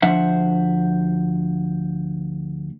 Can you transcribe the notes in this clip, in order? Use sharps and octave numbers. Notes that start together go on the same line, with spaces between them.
D2 F3 D4 C5 E5 F#5